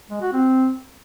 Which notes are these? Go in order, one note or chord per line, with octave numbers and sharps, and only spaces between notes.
G#3
F#4
C4